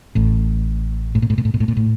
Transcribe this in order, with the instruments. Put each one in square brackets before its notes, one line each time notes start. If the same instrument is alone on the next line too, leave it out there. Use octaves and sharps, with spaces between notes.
[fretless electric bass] A1 A2
A2
A#2
A2
A#2
A2
A#2
A2
A#2
A2